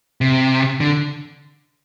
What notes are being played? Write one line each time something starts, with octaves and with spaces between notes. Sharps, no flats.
C3
D3